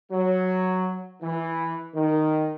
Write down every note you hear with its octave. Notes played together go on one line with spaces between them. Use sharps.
F#3
E3
D#3